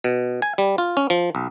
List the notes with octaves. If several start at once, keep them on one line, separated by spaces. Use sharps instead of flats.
B2
G#5
G3
F4
C#4
F3
B1